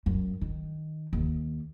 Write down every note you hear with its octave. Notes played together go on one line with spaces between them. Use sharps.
F#2
D#3
D#2